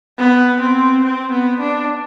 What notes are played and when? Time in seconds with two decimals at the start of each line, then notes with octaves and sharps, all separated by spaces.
0.18 B3
0.60 C4
1.04 C4
1.31 B3
1.60 D4